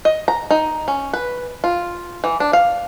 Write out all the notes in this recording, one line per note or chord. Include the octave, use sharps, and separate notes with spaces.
D#5
A#5
D#4
C#4
B4
F4
E3
D4
F5